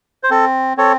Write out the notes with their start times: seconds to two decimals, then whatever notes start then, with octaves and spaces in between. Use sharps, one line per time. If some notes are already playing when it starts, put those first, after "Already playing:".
0.23 C5
0.30 C4 A4
0.77 C4 A4 C#5